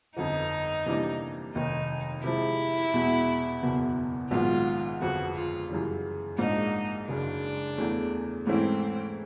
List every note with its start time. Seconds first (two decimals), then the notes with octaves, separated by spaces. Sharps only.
0.16 G1 F2 D3 F3 D#4
0.86 C3 E3 G3 A#3 D4
1.55 F1 D#2 D#3 D#4
2.24 C3 F3 G#3 E4
2.94 E2 B2 G#3
3.62 F#1 E2 B2
4.31 A#1 G#2 D#3 F#3 B3 F4
5.01 G1 F2 C#3 F3 F#4
5.35 F4
5.69 F#2 C#3 E3 G3
6.38 A#1 G#2 F3 A#3 D4 D#4
7.08 F#1 F#2 C#3 D4
7.78 E2 C#3 E3 A3
8.47 G#2 E3 A3 C4 C#4 E4